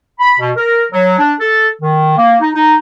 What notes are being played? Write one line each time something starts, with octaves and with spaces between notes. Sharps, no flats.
B5
B2
A#4
F#3
D4
A4
D#3
A#3
D#4
D#4